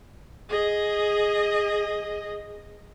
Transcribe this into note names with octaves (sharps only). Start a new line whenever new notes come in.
G#4 D#5